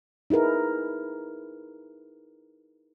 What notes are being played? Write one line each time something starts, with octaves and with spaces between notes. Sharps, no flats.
D#4 E4 G#4 A#4 B4